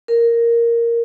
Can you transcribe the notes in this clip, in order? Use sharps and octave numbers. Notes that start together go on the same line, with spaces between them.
A#4